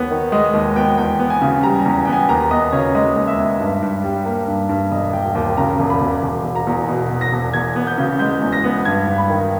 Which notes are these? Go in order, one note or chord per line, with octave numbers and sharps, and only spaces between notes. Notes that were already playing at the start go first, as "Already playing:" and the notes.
Already playing: D#2 B3 C#5
D#3
G#3 D#5
D#2
B3 G5
E2 G5
B3
G#5
C#3
G3 A#5
A#5
E2
B3 G5
G#5
D#2 A#5
B3 D#5
C#3 C#5
G#3 D#5
D#2
E5
B3
G2
G2
G3
A#3
G2
G2
E1 D#5
E1 G5
D#2 G5
C#3 A#5
E1
B5
E1
E1
E1
A#5
E2
B2
E1
A#6
E1
E2 G#6
B3
G6
C#3
G#3 G6
E2
A#6
B3
G2 G#6
G2
B5
D#3